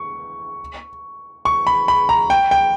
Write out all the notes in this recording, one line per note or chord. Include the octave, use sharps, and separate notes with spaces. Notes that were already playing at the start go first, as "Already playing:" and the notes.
Already playing: C#6
C#6
B5
B5
A#5
G5
G5